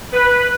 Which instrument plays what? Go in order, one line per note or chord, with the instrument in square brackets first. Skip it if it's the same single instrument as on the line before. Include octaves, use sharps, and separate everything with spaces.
[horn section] B4